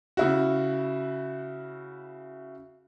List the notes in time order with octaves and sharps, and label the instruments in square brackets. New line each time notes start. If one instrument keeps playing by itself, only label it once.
[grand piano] C#3 E4 F#4